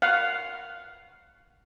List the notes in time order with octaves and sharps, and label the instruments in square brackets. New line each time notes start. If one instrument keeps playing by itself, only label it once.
[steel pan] F5 F#5